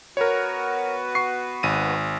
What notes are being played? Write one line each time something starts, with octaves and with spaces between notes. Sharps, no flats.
B3 F#4 A#4 B4 C#5
C#6 C7
G#1 D#7